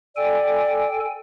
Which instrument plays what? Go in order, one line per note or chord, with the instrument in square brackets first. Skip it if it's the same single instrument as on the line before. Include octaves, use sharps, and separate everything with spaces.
[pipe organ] A4 G5 G#5 [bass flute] D5